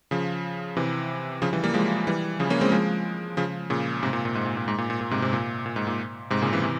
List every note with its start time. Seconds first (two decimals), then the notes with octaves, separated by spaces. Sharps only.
0.11 C#3 F3
0.77 C3 E3
1.42 C#3 F3
1.53 E3 G3
1.63 G3 A#3
1.74 F3 G#3
2.07 E3 G3
2.39 C#3 F3
2.50 A#3 C#4
2.61 G#3 C4
2.72 F3 G#3
3.37 C#3 F3
3.70 A#2 C#3
4.02 G#2 C3
4.13 A#2
4.25 A#2
4.35 G#2
4.46 A#2
4.57 A#2
4.68 G#2
4.78 A#2
4.90 A#2
5.01 A#2
5.11 G#2 C3
5.22 G#2 C3
5.33 A#2
5.66 A#2
5.76 G#2
5.87 A#2
6.30 G#2 C3
6.42 A#2 C#3
6.52 C3 E3
6.63 C3 E3